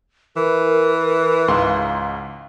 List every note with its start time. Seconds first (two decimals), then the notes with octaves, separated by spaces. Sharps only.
0.36 E3 A#4
1.48 C#2 G#2 F5 C6